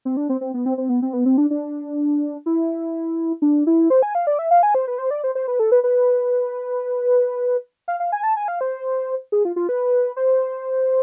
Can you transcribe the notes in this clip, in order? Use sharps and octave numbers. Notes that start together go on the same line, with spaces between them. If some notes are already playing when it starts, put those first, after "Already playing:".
C4
D4
C4
C4
B3
C4
C4
B3
C4
B3
C4
D4
D4
E4
D4
E4
C5
G#5
F5
D5
E5
F5
G#5
C5
B4
C5
D5
C5
C5
B4
A4
B4
B4
F5
F5
G#5
A5
G#5
F5
C5
G#4
F4
F4
B4
C5